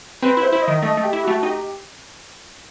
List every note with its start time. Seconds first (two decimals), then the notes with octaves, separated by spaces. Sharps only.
0.22 C4 B4
0.37 E4
0.42 C5
0.52 E4
0.62 D#5
0.68 D#3
0.82 A3 D#5
0.97 A3
1.03 G4
1.13 E4
1.23 A3 F#4
1.43 D#4 G4